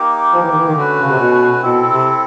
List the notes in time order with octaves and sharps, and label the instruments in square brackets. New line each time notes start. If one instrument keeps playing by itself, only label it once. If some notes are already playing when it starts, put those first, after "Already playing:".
Already playing: [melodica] A#3 D#4 G4 A#4
[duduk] F3
E3
D#3
E3
D#3
[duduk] D3 [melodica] A3 C#4 F#4 B4
[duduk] C#3
C3
B2
[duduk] B2 [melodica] C4 E4 A4
[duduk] C3